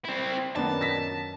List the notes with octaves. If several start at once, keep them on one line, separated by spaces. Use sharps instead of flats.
C4 E4
F#2 D#3 B3 D4 A5
A#6 B6